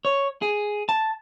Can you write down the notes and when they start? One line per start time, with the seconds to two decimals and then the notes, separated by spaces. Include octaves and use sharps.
0.05 C#5
0.42 G#4
0.89 A5